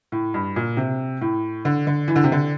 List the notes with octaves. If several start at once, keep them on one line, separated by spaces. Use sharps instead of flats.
A2
G2
A#2
C3
A2
D3
D3
E3
D3
C3
D3